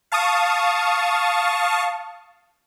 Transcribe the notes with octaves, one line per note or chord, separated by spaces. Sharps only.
F5 A5 C#6 D#6